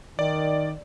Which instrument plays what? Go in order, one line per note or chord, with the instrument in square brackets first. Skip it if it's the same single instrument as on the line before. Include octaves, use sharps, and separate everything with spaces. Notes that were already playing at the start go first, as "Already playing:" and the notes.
[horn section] D#3 [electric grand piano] D5